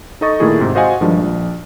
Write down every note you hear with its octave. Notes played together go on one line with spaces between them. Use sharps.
D#4 A4 D#5 C#6 A6
A#2 D#3 A3 E4 G#4
G#2 C3
F#4 C5 D#5 F5 F#5 G#5
G2 D#3 F3 G#3 D4
A#1